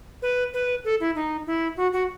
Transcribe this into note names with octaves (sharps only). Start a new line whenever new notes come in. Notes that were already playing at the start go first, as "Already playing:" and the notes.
B4
B4
A4
E4
D#4
E4
F#4
F#4